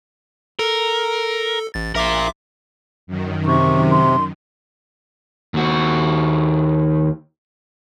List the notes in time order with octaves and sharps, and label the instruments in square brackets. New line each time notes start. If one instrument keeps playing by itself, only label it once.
[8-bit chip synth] A4 [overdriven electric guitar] A#4
[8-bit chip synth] A1 A6
[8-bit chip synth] A#1 E5 D6 [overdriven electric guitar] F4 A#4
[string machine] F#2 D#3
[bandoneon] C3 [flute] C#6
[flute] C6
[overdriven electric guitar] D#2 F#4